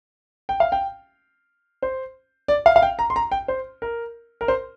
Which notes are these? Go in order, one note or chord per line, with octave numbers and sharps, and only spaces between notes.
G5
F5
G5
C5
D5
F5
F5
G5
A#5
C6
A#5
G5
C5
A#4
A#4
C5